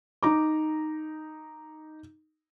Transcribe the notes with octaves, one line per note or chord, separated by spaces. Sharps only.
D#4 A#5 D6